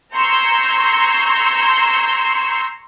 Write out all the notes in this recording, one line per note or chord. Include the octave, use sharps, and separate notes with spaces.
A#5 C6 C#6 E6 G6 G#6